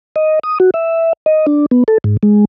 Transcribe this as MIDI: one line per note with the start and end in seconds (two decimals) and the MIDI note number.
0.16 0.39 75
0.43 0.58 87
0.60 0.70 66
0.74 1.13 76
1.26 1.46 75
1.47 1.66 62
1.71 1.84 59
1.88 1.98 69
2.04 2.17 44
2.23 2.45 56